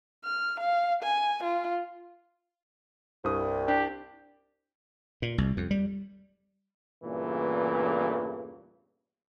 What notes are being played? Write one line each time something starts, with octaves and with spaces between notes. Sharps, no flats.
F6
F5
G#5
F4
C2 G2 D#6
D4 G4
A#2
C2
F2
G3
E2 G2 A#2 C#3 E3 A3